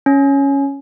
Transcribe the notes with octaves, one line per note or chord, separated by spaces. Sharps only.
C#4